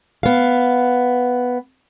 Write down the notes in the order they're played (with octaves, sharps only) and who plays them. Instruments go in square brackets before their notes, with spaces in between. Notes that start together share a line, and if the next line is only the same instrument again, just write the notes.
[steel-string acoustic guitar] B3 F5